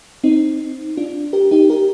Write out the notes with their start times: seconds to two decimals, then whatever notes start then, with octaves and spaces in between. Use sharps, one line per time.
0.24 C4 D#4
0.97 D4 F4
1.33 G4 A#4
1.51 D#4 G4
1.70 G4 A#4